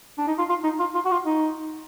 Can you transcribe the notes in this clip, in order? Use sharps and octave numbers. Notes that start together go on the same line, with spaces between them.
D4
D#4
F4
F4
D#4
F4
F4
F#4
F4
D#4